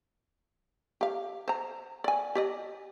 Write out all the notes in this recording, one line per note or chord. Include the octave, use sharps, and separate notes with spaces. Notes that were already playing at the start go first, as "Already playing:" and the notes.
G4 F5
C5 A#5
D5 G#5
G4 D5 D#5